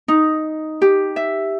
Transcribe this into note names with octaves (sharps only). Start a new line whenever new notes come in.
D#4
G4
E5